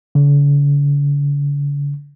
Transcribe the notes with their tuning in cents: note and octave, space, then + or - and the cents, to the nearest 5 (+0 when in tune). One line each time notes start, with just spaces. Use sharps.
D3 -45